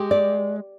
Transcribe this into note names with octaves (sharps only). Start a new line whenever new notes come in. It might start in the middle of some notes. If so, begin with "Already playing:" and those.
Already playing: G#3 G4
D5